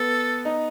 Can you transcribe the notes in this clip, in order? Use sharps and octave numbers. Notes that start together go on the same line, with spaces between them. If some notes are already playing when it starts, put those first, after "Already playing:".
Already playing: B3 A4
D#4